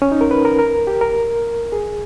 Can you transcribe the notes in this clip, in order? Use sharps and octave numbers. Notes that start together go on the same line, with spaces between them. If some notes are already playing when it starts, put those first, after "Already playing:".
C#4
D#4
A#4
B4
A#4
A#4
G4
A#4
G#4